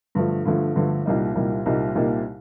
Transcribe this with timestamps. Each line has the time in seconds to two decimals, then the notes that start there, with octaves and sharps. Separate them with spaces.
0.15 G2 D3 F3 A3
0.45 G2 D3 F3 A3
0.75 G2 D3 F3 A3
1.06 C2 A#2 G3 A#3 D#4
1.35 C2 A#2 G3 A#3 D#4
1.66 C2 A#2 G3 A#3 D#4
1.95 C2 A#2 G3 A#3 D#4